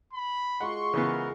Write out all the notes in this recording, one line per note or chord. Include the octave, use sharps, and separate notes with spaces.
B5
G#3 F4 F#4 F#5 C6 C#6
C#3 E3 B3 A#4